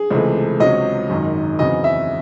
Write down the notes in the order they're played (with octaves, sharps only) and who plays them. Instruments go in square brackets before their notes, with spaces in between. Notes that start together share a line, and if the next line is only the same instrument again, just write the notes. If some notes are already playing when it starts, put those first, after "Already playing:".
Already playing: [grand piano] G#4
C#2 C3 E3 A3
C#2 C3 F#3 C#4 D#5
G#1 F#2 D#3
E2 C#3 F#3 C4 D#5
E5